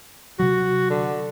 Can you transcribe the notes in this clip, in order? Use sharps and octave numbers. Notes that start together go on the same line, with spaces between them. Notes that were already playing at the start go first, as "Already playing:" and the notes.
C3 F#3 F#4
D3